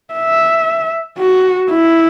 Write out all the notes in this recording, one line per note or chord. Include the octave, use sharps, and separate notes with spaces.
E5
F#4
E4